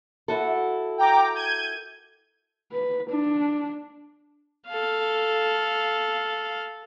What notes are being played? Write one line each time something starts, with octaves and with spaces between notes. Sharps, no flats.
E4 F#4 A4
G5 A#5 D6
G6 G#6 D#7
B4
D4
A4 F5